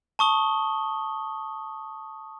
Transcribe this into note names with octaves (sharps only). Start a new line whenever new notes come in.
A5 C#6 D#6 G7